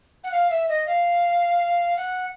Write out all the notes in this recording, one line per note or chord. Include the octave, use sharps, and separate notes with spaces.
F#5
F5
E5
D#5
F5
F#5